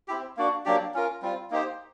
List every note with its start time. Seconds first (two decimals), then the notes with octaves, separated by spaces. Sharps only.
0.08 C4 E4 G4
0.37 A#3 D4 F#4
0.65 F#3 A#3 D4 G4
0.94 C#4 F4 A#4
1.22 G3 C4 F4
1.50 A#3 D#4 G4 C5